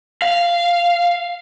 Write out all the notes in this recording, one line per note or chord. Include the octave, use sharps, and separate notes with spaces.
F5